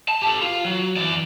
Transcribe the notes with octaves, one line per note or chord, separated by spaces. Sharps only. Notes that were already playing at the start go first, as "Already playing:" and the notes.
A5
G4 A4
F4
F#3
E3 D5